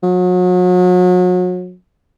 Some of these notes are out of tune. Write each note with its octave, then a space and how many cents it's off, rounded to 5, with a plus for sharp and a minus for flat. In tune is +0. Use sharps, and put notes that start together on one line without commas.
F#3 -35